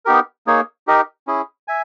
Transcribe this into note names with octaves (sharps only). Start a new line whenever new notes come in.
B3 D#4 G4 A#4
A#3 D#4 G#4 C#5
D#4 G4 A#4 D#5
C#4 E4 G#4
E5 G#5